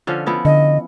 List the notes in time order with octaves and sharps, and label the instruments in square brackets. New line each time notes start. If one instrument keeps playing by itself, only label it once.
[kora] D3 F3 C#4
F3 B3 E4
[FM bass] D3 [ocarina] D#5